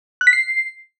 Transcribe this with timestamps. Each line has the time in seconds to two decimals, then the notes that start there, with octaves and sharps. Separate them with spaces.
0.21 F#6
0.27 B6
0.33 C7